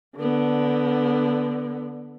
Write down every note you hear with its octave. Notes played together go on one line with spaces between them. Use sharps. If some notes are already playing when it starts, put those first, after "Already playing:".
D3 B3